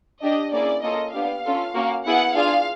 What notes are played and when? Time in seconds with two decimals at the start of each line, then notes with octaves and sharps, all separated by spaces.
0.22 D4 G4 D#5
0.53 A#3 C#4 E4 G#4 D5
0.83 A#3 C#4 F4 A4 D#5
1.14 B3 D4 G4 F5
1.45 C#4 F4 A4
1.75 A#3 C#4 F#4
2.05 B3 E4 G#4 F#5
2.35 D4 F4 G#4 F5